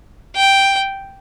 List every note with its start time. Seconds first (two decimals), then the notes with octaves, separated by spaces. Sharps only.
0.36 G5